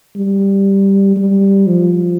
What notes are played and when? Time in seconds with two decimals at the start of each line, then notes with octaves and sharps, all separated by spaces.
0.16 G3
1.16 G3
1.66 F3